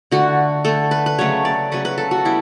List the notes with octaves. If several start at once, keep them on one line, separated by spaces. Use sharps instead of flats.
D3 A3 F#4
D3 A3 A4
B4
B4
C#3 F#3 A3 C#5
D5
C#3 F#3 A3 B4
B4
A4
F#4
G3 B3 E4